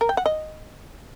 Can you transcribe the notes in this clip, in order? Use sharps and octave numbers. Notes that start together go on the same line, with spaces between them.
A#4
G5
F#5
D#5